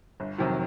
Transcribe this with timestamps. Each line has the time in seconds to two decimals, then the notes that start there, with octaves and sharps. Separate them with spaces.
0.20 G1
0.38 F2 C3 D#3 F#3